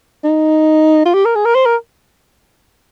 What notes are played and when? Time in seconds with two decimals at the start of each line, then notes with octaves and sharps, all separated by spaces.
0.24 D#4
1.06 F4
1.14 G4
1.25 A#4
1.36 G#4
1.45 A#4
1.55 C5
1.66 A#4